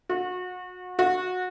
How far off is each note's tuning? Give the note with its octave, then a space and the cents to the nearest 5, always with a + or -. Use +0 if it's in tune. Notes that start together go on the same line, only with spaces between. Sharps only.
F#4 -30
F#4 -20